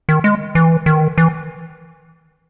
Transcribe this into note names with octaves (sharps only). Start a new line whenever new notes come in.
D#3
G#3
E3
D#3
E3